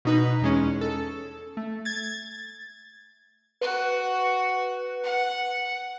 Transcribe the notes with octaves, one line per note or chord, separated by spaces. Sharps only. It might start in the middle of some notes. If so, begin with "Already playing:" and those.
B2 D#4 B4
E2 G#3 C#4
A4
A3
G#6 A6
F#4 B4
F#5